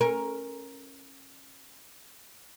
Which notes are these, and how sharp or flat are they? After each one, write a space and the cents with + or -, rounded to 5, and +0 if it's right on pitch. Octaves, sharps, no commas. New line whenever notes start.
C#4 -25 A#4 +10